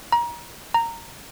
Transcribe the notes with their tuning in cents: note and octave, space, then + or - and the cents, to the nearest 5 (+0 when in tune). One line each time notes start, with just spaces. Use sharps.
A#5 +25
A#5 -15